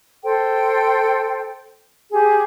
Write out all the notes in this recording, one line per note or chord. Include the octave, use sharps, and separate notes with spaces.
A4 C5 G5
G4 G#4